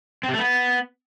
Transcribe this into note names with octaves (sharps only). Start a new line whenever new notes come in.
C4
C3
A3
B3